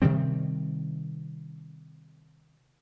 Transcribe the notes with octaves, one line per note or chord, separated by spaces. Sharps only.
C3 D#3 G3 C4